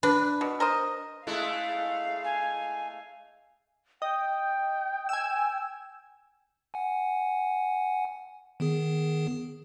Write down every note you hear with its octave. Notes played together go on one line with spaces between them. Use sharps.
D4 B4
B2
A#4 C5 D#5
G#3 A3 E4 F5
G#5
D#5 G5
G#5 E6
F#5 G#5
D#3 B3 G#4